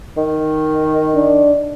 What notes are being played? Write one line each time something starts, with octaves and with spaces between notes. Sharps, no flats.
D#3
D4